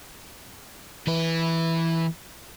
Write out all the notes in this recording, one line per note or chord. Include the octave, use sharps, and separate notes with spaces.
E3 B4